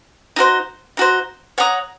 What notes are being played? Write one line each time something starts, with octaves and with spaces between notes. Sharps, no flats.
D#4 F#4 C5
D#4 F#4 C5
C#5 F#5 A#5 D#6